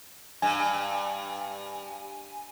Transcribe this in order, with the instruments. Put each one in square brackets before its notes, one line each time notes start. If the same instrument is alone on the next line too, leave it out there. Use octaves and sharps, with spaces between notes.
[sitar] G2 [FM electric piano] G#5